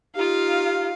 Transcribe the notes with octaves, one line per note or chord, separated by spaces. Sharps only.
D#4 F4 G4 F5